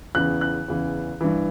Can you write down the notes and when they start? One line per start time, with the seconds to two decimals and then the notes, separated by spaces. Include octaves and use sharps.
0.15 E2 C#3 E3 F#6
0.41 F#6
0.68 E2 C#3 E3
1.21 G2 E3